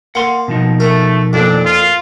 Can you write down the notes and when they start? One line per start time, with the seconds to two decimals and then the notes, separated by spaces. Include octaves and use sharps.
0.15 A#3 F#5 C6
0.48 B2 F3 D#4
0.80 A3 A#4
1.33 F2 A#2 D4
1.66 F4